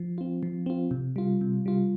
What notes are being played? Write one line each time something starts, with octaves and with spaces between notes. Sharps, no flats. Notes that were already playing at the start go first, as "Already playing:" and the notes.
Already playing: F3
C4 F4
F3
C4 F4
C3
G3 F4
C3
G3 F4